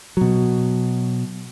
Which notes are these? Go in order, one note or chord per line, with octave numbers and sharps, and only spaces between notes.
B2 F#3